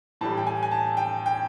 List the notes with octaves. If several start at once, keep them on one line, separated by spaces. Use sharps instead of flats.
A2 E3 G3 A5
G5
G#5
G#5
A5
G5
G5